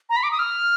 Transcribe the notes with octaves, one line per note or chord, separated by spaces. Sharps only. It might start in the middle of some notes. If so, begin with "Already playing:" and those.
A#5
B5
D6
D#6
F6